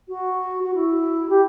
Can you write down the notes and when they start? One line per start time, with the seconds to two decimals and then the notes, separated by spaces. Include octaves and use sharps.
0.08 F#4
0.63 F#4
0.74 E4
1.29 G4